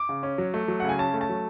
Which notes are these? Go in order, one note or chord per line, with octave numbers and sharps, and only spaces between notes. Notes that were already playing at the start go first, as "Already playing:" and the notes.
Already playing: D6
C#3
C#4
F#3
A3
F#3
C#3 F#5
G#5
C#4 A5
A3
A5
F#3